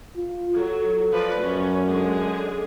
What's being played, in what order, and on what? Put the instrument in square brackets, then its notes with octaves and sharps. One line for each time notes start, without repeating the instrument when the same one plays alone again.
[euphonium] F4
[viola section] F#3 [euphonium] A4
[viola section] F3 B4 D5
[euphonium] F#2 [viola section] C#4
[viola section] D3 G#3 G#4